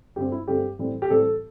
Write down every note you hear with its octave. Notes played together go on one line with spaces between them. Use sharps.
G2 D3 A3 C4 G4
E4
G2 D3 A3 C4 G4
A2 E3 G3 C4
G4
A2 E3 G3 C4 A4